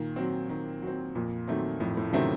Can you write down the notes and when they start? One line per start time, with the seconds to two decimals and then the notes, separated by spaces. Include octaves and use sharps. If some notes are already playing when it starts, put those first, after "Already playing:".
Already playing: A#2 D#3
0.16 F#3 C4
0.49 D#3
0.82 F#3
0.87 C4
1.15 F2 A#2
1.48 D#3 F#3 A3 C4
1.80 F2 A2
1.97 A2
2.09 C#3
2.13 C3 D#3 F#3 A3 C4